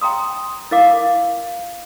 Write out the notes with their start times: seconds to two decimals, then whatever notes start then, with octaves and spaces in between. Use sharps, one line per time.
0.02 G5 A#5 C6 D#6
0.71 E4 A#4 F5 D6